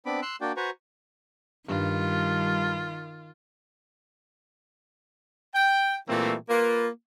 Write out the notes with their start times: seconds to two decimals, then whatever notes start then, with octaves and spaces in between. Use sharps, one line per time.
0.06 B3 C4 D4 B5 D6
0.22 C6 E6 F#6
0.41 A#3 D4 F#4 D5 G5
0.57 F#4 B4 C5 G#5 A#5 C#6
1.68 G2 D#3 G3 F4
5.54 G5
6.09 A#2 E3 G3 A3 A#3 C4
6.50 A#3 F4 B4